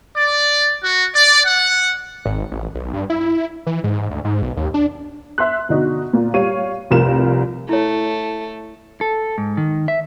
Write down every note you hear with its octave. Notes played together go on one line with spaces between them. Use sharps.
D5
F#4
D5
F#5
G#1
A1
B1
G2
E4
E3
G#2
D2
G#2
B1
D#2
D4
E5 C6 F#6
B2 D3 D#4 F#4
A#2 F4
G3 C#5 F5 D#7
F1 C2 F4 A#4 E7
A3 E4 C#5
A4
G#2
D#3
E5